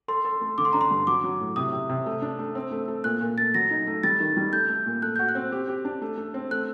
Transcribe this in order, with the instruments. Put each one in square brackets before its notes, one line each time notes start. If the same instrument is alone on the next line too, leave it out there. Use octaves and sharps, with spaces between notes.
[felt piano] A4 [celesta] C6
[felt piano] A4
A3
[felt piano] D3 [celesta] D6
[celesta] C6
[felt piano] D4 [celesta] A#5
[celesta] C6
[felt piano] G2
[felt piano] F#3 [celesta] D6
[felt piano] F#3
A2
[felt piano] C3 [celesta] D#6
[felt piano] C3
C3
A3
D4
A3
C4
A3
A3
[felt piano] A#2 [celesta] F#6
[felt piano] A#2
[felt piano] A3 [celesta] A6
[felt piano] F#3 [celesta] A#6
[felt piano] D#4
A3
[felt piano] G3 [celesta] A6
[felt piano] D#3
G3
[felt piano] A3 [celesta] G6
[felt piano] A3
A#2
[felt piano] A3 [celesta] F#6
[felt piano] F#4 [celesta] G6
[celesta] F#6
[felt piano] C4
G4
G4
D4
A3
A3
C4
[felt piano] A3 [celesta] F#6